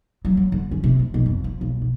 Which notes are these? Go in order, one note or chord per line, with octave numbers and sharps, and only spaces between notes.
F#3
F#3
D3
C#4
C3
F3
B1
F2
F3
B1
B2